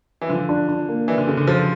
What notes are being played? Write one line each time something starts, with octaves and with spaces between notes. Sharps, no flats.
E3
D3 F3
D4
D4
A#3
E3 D5
D3
C#3 A4
D3
F3 A4